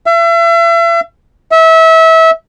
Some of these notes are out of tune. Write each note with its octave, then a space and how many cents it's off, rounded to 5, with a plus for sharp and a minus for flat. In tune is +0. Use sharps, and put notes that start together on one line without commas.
E5 +40
E5 -25